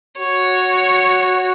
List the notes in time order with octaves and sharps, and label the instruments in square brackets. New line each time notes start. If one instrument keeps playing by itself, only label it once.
[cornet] F#4 [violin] C#5